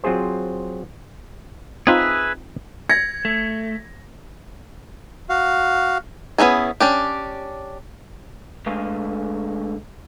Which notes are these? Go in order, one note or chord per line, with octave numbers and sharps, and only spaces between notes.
F#3 C4 F4 G#4 C5
C4 D#4 F4 G#4 B4 E5
G#6 A#6 C#7
A3
F#4 F5
B3 C#4 E4 G#4
C#4 D4 G4
D3 G#3 A3 B4 D#5 F5